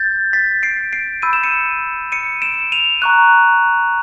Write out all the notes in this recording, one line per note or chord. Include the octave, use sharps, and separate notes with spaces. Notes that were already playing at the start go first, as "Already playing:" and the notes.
Already playing: G6 A6
A6 B6
C7 D7
C7 D7
B5 E6 G6 D#7
E7
C#7 D#7
C#7 D#7
D7 E7
D#7 F7
A#5 C#6 F#6